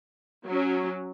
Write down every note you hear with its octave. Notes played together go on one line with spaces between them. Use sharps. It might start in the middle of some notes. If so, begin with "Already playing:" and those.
F#3 C#4